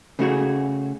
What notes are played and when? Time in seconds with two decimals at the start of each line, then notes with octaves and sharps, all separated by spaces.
0.19 C#3 A3 F#4 G#4